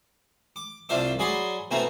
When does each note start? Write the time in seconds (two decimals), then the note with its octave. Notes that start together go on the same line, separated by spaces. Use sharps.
0.56 D6
0.89 C2 D4 F4 C5 E5 D6
1.19 F#3 G#4 D5 B5 C6
1.71 B2 A3 C4 E4 G#5 A#5